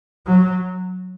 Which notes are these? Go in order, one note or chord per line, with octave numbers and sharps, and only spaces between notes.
F#3